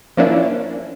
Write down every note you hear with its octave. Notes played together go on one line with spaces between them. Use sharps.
F3 A#3 C#4 D4 E4